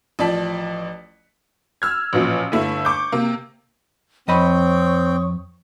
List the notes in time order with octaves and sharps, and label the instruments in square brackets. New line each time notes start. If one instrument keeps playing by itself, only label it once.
[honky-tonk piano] A1 F3 D5 A5 B6 F#7
E6 F6 G#6
A1 A#2 F3
G1 A3 E4
C#6 D6 G6
C3 A#3
[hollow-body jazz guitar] F2 D#5 B5 [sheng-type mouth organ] C4 G5 [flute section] C#5 C#6 D#6